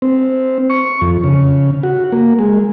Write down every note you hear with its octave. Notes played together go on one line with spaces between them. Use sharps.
C4
C#6
F2
C#3
F#4
A#3
G#3